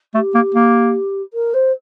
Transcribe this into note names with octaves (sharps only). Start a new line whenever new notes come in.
A3 G4
A#3
A#3
A#4
C5